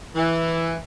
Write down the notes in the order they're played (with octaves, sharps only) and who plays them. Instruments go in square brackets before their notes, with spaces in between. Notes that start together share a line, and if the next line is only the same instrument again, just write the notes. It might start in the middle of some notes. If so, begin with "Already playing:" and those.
[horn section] E3